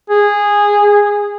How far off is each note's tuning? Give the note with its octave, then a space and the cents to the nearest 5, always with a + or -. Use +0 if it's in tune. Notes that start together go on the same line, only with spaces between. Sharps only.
G#4 -15